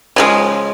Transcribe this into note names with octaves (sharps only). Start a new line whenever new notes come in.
C#3 F3 G#3